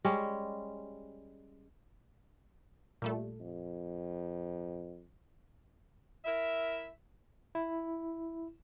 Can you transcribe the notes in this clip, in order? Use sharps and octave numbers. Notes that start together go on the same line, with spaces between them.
G3 G#3 C#4
A#2 G3 A3
F2
E4 A#4 E5
E4